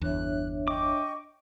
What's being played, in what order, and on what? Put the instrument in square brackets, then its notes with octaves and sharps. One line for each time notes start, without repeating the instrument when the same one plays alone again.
[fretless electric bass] G1 E2 [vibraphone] D4 C#5 E5 [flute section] F#6
[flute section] D#5 G5 C#6 [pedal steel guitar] D6